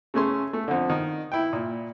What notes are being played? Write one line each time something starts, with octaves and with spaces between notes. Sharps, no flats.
C#3 A3 C#4 C6
A3
F2 D3
D#3
E4 G5
A#2